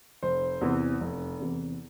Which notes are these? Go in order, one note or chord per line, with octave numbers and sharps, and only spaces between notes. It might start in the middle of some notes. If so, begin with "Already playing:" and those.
F1 C5
E2 C3 E3
F1
E2 C3 E3